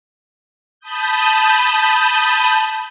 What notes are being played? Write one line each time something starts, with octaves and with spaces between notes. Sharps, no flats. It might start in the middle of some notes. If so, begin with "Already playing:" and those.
A5 B5 D#6 G6